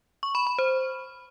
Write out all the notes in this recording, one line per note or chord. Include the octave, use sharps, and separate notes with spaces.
C#6
B5
B5
C5